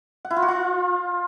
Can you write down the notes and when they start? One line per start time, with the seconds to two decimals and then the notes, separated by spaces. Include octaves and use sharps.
0.25 F#5
0.31 E4
0.36 F4
0.42 F#4
0.48 F4